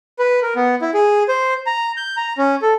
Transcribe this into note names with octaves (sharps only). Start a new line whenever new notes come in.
B4
A#4
B3
E4
G#4
C5
A#5
G6
A#5
C#4
A4